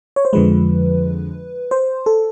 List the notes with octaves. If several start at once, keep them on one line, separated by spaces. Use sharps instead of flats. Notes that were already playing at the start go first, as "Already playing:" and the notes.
C#5
C5
F2 D3 F3 G#3 B4
C5
A4